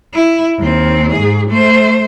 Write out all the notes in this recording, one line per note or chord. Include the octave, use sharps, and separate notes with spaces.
E4
D#2 C4
G#2 G#4
A3 C5